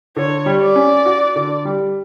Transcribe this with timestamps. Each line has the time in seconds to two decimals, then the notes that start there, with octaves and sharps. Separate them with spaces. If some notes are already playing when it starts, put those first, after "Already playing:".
0.17 D3 C#5
0.46 G3
0.61 D5
0.76 C#4
1.06 F#4
1.36 D3
1.65 G3